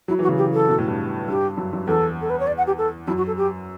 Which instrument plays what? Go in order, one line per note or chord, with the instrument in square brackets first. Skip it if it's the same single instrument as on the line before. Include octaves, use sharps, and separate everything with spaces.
[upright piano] F#3 [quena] E4
[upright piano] E3 [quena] F#4
[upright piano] C#3
[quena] G4
A4
[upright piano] B2
A2
G2
[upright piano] G2 [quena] G4
[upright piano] F#2
F#2
[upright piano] E2 [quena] A4
[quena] A4
B4
C#5
D5
F#5
G4
A4
[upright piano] F#2 [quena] E4
[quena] F#4
A4
G4